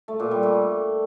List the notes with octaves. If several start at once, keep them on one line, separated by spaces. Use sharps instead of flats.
A3
A#2
G3
A3